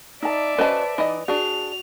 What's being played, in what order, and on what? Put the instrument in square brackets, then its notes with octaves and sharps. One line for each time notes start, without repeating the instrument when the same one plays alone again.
[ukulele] D#4 A5 [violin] D5 E5
[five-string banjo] C#4 F#4 D#5 [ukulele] B4 C5 A5
[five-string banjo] E3 D#5 [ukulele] D#4 D5
[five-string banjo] D4 G#4 [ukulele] F#4 [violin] F7